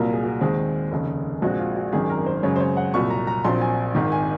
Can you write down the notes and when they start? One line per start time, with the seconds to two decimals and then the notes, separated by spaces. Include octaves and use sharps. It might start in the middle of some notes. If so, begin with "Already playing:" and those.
Already playing: C2 A#2 F#3 A#3 A#4
0.13 G#4
0.24 F#4
0.41 D#2 D#3 G#3 C4 G#4
0.91 F1 D#2 C#3
1.42 A#1 A#2 G#3 C4 F#4
1.59 F4
1.76 F#4
1.93 G#1 F#2 D#3 G#4
2.10 A#4
2.26 C5
2.43 F#2 C#3 G#3 C#5
2.56 C5
2.60 C#5
2.77 F#5
2.94 C2 A#2 F#3 C#6
3.10 A#5
3.27 A#5
3.44 A#1 A#2 F#3 C4 C6
3.61 G#5
3.95 G#1 G#2 D#3
4.12 G#5